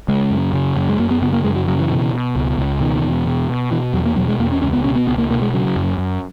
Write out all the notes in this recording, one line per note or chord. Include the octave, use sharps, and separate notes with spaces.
C#3 G#3
F#2
C#3
F#2
G#3
F#2 A#3
B3
C#3 B3
A#3
F#2 G#3
F#3
C#3 F#3
E3
B2
B2
C#2
C#2
B2 D#3
E2
B2
B2
B2 E3
E2 F#3
A#3
B2 F#3
G#3
E2 A#3
C#4
C#2 C#4
B3
B2 C#4
B3
C#2 B3
A#3
B2 A#3
G#3
C#3 F#3
F#2
F#2